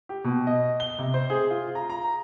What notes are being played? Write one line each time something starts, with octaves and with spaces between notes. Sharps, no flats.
G4
B2
D#5
G7
C3
C5
G#4
F4
A#5
A#5